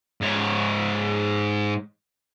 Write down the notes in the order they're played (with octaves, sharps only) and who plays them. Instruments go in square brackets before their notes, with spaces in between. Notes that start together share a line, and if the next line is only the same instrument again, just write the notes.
[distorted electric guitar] G#2 C#5